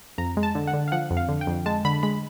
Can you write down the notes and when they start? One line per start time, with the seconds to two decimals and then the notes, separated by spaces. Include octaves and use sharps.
0.18 F2 A#5
0.37 G#3
0.43 A5
0.55 D3
0.67 F#5
0.73 D3
0.88 F5
0.92 F3 F#5
1.10 F2
1.17 F5
1.29 D3
1.41 G5
1.47 F2
1.66 G#3 A5
1.85 D3 B5
2.03 G#3 B5